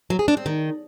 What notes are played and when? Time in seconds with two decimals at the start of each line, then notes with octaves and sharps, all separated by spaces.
0.10 F#3
0.19 G#4
0.28 D4
0.37 C4
0.46 D#3